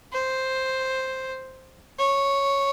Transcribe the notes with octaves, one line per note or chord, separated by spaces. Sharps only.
C5
C#5